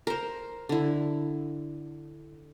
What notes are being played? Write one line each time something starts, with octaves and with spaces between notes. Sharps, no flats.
A#4 C5
D3 E4